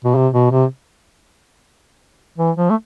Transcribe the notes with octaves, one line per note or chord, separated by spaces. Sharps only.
B2
C3
B2
C3
E3
F3
A3